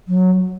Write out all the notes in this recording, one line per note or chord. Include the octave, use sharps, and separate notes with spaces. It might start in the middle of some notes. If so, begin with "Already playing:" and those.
F#3